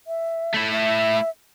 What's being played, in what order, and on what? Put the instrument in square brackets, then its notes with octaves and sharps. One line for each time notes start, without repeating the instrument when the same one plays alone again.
[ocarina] E5
[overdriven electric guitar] A3 E4
[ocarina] E5